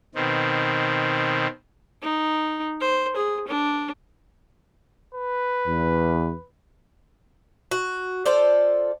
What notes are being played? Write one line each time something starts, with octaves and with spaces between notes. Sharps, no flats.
B2 D#3 C4
D#4
C5
G#4
D4
B4
E2
F#4
F4 A4 C5 D5